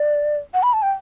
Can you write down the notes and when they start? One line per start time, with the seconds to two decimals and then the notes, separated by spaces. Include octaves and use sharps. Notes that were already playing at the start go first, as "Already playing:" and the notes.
Already playing: D5
0.54 F#5
0.63 B5
0.73 A5
0.82 G5